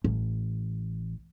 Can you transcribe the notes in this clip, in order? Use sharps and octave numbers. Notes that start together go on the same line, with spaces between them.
A1